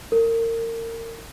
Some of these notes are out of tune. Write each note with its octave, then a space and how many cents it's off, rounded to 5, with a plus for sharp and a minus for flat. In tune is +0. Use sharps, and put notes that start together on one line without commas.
A#4 -30